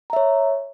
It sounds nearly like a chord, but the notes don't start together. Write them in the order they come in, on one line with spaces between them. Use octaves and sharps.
A#5 E5 C#5